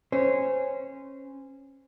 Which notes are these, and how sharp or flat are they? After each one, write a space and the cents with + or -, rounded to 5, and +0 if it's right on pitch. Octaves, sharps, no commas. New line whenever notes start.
C#4 -20 C5 -20